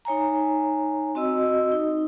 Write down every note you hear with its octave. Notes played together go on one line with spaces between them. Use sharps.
D#4 C#5 G#5 A#5
C4 F#4 D#5 E6
D#4